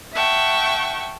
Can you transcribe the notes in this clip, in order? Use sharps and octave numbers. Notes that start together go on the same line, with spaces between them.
E5 F#5 G5 A5 C#6